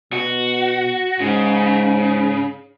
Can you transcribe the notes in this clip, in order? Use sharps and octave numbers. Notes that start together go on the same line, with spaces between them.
B2 F#4
G#2 C#3